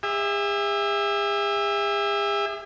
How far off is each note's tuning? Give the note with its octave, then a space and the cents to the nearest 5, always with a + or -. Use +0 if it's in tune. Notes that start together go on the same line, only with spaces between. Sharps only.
G#4 -40 E5 +0